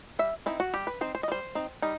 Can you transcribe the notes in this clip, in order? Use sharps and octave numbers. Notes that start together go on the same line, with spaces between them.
G3 E5
C4 D#4 E4
F#4
G3 G4
B4
C4 D#4 C5
C5
D#5
G3 C5
C4 D#4
G3 D#4